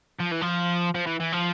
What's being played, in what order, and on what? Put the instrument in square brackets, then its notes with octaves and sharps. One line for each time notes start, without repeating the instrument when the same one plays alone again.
[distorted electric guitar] F3
E3
F3
F3
E3
E3
F3